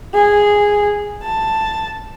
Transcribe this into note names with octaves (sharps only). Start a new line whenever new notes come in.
G#4
A5